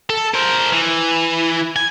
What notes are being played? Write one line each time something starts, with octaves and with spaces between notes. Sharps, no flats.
A4
A#4 C5
E3
G#5